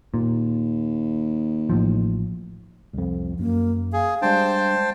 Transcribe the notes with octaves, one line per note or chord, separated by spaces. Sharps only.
D#2 A#2
A1 A2 F3
C2 F2
F#2 A#3
G#4 F5
G3 G#3 D4 C5 G5 A5